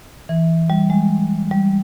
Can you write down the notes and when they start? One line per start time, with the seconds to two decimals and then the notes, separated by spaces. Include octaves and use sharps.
0.29 E3
0.70 G3
0.90 G#3
1.51 G3